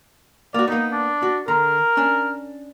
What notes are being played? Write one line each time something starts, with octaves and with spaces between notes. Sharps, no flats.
A#3 F#4 D5
A#3 B3 D#4
D4
F#4
D3 A#4 A#5
C#4 D4